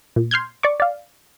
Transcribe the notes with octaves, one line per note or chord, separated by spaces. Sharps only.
A#2
C6 F6 G6 G#6
D5 C#6 D6
D5 F5